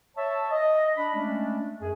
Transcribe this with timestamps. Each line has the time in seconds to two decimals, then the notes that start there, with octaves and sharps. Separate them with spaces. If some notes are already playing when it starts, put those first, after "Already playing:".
0.16 C#5 E5 A5
0.51 D#5
0.96 D4 B5
1.15 G#3 A3 C#4 D4
1.81 F#2 G#4 G#5